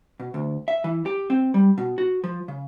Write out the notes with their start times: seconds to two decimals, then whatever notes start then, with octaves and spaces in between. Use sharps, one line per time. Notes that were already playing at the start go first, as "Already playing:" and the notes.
0.20 B2
0.34 D2
0.68 E5
0.84 E3
1.06 G4
1.30 C4
1.54 G3
1.78 B2
1.98 F#4
2.24 F3
2.48 C#3